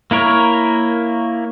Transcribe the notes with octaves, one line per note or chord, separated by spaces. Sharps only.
A#3 E4 A#4 C#5